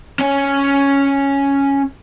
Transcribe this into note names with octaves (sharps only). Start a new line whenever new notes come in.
C#4 C#5